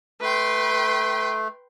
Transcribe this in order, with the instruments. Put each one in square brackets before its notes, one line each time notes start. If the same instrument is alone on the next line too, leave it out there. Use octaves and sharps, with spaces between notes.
[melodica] A3 [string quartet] B4 G5 C6